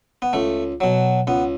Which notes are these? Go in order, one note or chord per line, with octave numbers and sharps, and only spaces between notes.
B3
C#2 A3
B2 F#3
C#2 B3